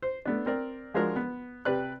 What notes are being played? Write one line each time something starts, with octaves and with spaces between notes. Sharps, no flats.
C5
A3 B3 D4
C4 A#4 D5
F3 G#3 D4 F#4 A#4
B3
C3 G4 B4 D5 F#6